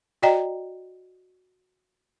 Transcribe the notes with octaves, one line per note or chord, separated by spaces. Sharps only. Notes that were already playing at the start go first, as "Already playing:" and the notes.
F#4 D5 D#5 G5 A#5